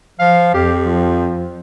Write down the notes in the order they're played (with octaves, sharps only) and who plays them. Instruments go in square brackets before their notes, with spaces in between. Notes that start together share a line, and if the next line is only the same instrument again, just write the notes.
[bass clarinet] F3 [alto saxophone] F5
[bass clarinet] F2 [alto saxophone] G4
[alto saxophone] F3